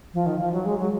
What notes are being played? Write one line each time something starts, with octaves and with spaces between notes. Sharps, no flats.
F3
D#3
F3
F#3
G#3
F#3